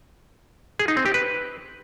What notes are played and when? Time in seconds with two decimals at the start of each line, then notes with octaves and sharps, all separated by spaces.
0.79 G#4
0.88 D#4
0.97 C4
1.06 G4
1.14 B4